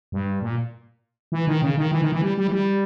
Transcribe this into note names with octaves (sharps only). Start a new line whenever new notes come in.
G2
A#2
E3
D#3
C#3
D#3
E3
D#3
E3
G3
G3
E3
G3